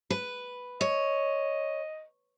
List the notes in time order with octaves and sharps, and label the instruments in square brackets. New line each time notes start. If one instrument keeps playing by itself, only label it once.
[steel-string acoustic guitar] B4
[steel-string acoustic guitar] C#5 [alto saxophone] D#5